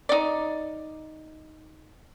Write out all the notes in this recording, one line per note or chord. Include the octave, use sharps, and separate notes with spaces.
D#4 D5